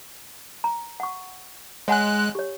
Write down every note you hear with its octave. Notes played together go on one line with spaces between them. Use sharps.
A#5
F#5 C#6
G#3 C#5 F#5 G#5 F#6
G4 C#5